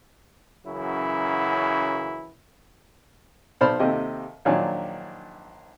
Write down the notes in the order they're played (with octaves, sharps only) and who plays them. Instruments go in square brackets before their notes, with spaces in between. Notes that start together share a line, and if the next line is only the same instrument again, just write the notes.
[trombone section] F#2 C#3 E3 F#3 E4
[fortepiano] B1 C5 D5 A5 B5 F6
D#2 C3 A4 D#5 G5
A#1 D#3 F#3 D4 G#5